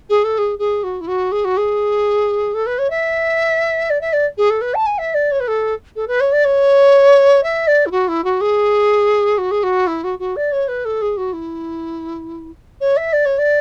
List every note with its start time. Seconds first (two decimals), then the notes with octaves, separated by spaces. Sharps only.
0.09 G#4
0.24 A4
0.38 G#4
0.59 G#4
0.83 F#4
1.01 E4
1.07 F#4
1.32 G#4
1.44 F#4
1.57 G#4
2.54 A4
2.66 B4
2.78 C#5
2.90 E5
3.90 D5
4.01 E5
4.13 D5
4.37 G#4
4.50 A4
4.61 B4
4.74 A5
4.86 G#5
4.98 E5
5.14 D5
5.31 C#5
5.40 B4
5.48 A4
5.96 A4
6.08 B4
6.20 C#5
6.32 D5
6.45 C#5
7.43 E5
7.67 D5
7.86 E4
7.91 F#4
8.08 E4
8.24 F#4
8.41 G#4
9.38 F#4
9.51 G#4
9.63 F#4
9.87 E4
10.04 F#4
10.19 F#4
10.36 D5
10.52 C#5
10.68 B4
10.85 A4
11.02 G#4
11.17 F#4
11.33 E4
12.81 C#5
12.97 E5
13.13 D5
13.25 C#5
13.38 D5